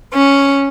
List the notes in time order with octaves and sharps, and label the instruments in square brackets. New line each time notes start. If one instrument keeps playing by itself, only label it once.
[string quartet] C#4